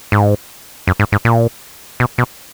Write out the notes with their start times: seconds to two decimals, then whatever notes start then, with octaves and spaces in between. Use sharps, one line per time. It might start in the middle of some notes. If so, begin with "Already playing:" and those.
0.12 G#2
0.87 F#2
1.00 G#2
1.12 G#2
1.25 A#2
2.00 B2
2.18 B2